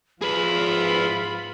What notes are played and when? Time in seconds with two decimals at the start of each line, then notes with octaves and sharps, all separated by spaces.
0.22 G#2 F3 F4 G#4 B4 B5